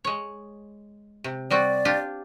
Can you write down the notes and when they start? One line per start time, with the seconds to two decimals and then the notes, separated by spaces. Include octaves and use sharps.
0.04 G#3 C#5
1.24 C3
1.50 G3 C4 F#4 D5
1.85 D4 F4 G4